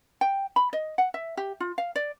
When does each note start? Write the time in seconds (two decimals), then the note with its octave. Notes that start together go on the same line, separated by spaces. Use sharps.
0.21 G5
0.56 B5
0.73 D#5
0.98 F#5
1.14 E5
1.37 G4
1.60 F4
1.78 F5
1.96 D5